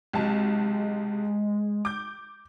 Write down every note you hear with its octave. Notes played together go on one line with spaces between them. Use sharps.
B1 C3 G#3 A5
D6 G6